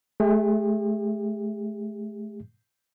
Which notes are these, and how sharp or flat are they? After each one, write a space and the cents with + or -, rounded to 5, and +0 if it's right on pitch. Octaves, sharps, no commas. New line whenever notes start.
A3 -35 G4 +45 E5 +0